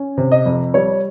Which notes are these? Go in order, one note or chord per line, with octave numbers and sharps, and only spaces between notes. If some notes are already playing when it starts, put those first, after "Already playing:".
Already playing: C#4
C3
D#5
F2
G3 C#5